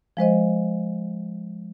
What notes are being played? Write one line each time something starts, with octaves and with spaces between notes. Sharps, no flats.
F3 G#3 C5 D#5